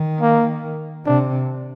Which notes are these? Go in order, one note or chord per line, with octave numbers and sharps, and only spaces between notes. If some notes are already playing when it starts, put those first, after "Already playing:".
Already playing: D#3
A#3
C3 D4